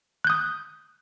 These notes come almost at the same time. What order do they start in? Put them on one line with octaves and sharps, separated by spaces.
F#6 G6 D#6